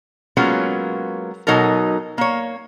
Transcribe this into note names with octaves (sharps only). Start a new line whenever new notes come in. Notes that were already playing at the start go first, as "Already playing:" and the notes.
F#3 G#3 A#3 B3 C#4 F4
B2 F#3 D#4 A4 A#4
A#3 C#5